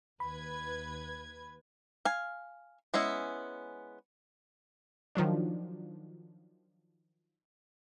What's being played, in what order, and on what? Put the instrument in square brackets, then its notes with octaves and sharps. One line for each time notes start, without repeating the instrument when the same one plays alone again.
[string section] D#2 B4 G#6 [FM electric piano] B5
[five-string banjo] F5 G#5
G#3 B3 C#4 E4
[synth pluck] D#3 F3 F#3 D4